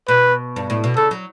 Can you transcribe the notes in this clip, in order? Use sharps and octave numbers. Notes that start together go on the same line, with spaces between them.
B2 B4
G2
A2
B2
C#3 A4
F#3